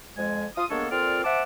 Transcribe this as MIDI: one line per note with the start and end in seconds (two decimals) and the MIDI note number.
0.17 0.45 41
0.17 0.45 56
0.17 0.45 80
0.56 0.65 65
0.56 0.65 87
0.70 0.86 56
0.70 0.86 58
0.70 0.86 59
0.70 0.86 62
0.70 0.86 69
0.70 0.86 73
0.91 1.23 46
0.91 1.23 60
0.91 1.23 65
0.91 1.23 69
0.91 1.23 74
0.91 1.23 89
1.24 1.42 72
1.24 1.42 76
1.24 1.42 78
1.24 1.42 81
1.24 1.42 86